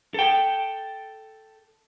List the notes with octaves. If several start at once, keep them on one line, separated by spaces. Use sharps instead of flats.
A4 G5